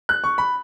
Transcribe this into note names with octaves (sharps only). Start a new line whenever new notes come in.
F#6
C#6
B5